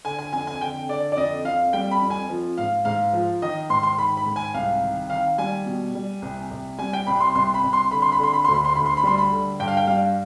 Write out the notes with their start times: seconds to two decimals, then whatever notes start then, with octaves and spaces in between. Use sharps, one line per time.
0.05 D3 G#5
0.19 G#5
0.33 F2 G#5
0.47 G#5
0.61 D3 G5
0.89 D3 D5
1.12 D5
1.16 F2 D#5
1.45 F2 F5
1.73 G3 G5
1.91 B5
2.02 F2
2.10 G#5
2.29 F3
2.58 G#2 F5
2.85 G#2 F5
3.13 F3
3.42 D#3 D#5
3.70 G#2 C6
3.83 C6
3.98 D#3 B5
4.17 B5
4.26 G#2
4.36 G#5
4.54 C2 F5
4.82 D#3
5.10 D#3 F5
5.38 G3 G#5
5.66 B2
5.95 G3
6.22 C2
6.51 C2
6.78 G3 G#5
6.93 G5
7.07 C2 B5
7.20 C6
7.35 C2 C6
7.54 B5
7.63 C2
7.73 C6
7.91 D3 B5
8.02 C6
8.12 B5
8.20 D3 C6
8.33 B5
8.44 D2 C6
8.54 B5
8.65 C6
8.76 D2 B5
8.86 C6
8.97 B5
9.03 G3 C6
9.18 B5
9.32 D3
9.60 G2 G5
9.68 F5
9.77 G5
9.87 G3 F5